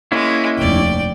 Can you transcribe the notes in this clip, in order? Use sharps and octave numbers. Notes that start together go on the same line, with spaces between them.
G#3 A#3 C#4 E4
F1 D#2 D5 G5